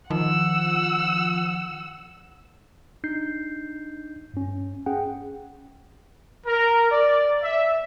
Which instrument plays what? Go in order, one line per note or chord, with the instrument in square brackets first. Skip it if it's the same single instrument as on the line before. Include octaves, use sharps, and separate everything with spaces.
[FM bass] D#3 [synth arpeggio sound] F3 [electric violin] F#5 E6
[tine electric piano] D4 D#4 G6 C7
G2 C#4
C#4 G#4 F#5 G5
[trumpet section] A#4
D5
E5